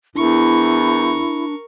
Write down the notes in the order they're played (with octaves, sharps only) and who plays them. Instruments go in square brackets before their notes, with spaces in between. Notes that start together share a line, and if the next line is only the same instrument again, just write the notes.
[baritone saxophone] E2 [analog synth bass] D4 [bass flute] E4 [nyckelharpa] A#4 C#6